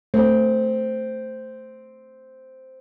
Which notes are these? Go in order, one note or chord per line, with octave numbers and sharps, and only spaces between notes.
A3 C4